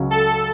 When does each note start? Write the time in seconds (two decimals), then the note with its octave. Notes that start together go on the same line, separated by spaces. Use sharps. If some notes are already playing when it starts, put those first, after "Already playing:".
Already playing: C#2 C#3 F#3 C#4
0.11 A4